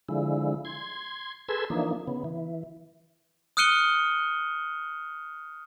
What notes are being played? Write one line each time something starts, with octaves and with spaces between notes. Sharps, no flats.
D3 F3 G#3 E4
C6 G#6
G#4 A4 B4 C6 E6 G#6
E3 F3 A#3 D4 D#4
C#3 B3
E3
D#6 F6 F#6 C#7 D#7 G7